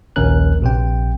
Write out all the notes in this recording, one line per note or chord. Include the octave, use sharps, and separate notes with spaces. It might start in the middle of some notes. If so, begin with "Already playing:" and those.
A#1 D#2 C#4 A#4 F#6
A#1 C3 G5